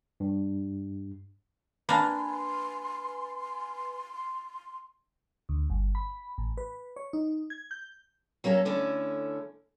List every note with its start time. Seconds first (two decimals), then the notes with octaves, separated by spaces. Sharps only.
0.20 G2
1.89 A#3 D4 B4 G#5 C6
5.49 D2
5.70 G1
5.95 B5
6.38 A1
6.57 B4
6.96 C#5
7.13 D#4
7.50 G#6
7.71 G6
8.44 F#3 A#3 C#4 F4 A4
8.65 D3 A3 C#4 E4